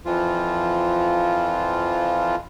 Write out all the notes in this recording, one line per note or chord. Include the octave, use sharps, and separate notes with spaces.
F2 E3 F3 F4